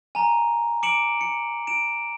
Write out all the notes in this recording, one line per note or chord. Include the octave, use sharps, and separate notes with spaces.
G#5 A#5
D6 C#7 D7 E7 F#7
C#7
D7 E7